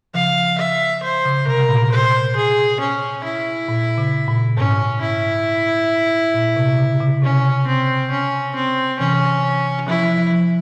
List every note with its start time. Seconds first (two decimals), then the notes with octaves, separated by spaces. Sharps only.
0.14 C#3 F3 F5
0.58 E5
1.03 C5
1.25 C#3
1.47 C3 A#4
1.69 A#2
1.92 C5
2.36 G#4
2.80 C#4
3.24 E4
3.68 A#2
3.98 C#3
4.28 A#2
4.57 G#2 C#4
5.01 E4
6.34 A#2
6.56 C3
6.78 C#3
7.00 C#3
7.22 C3 C#4
7.67 C4
8.11 C#4
8.55 C4
8.99 C3 E3 C#4
9.88 F3 E4
10.03 F3
10.18 F3
10.32 F3